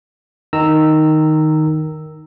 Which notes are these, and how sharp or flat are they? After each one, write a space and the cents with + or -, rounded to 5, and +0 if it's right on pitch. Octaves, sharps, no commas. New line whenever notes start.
D#3 +0 A#5 -10 E6 +0